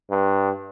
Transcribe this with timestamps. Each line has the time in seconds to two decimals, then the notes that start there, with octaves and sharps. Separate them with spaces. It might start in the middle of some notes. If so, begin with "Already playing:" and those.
0.10 G2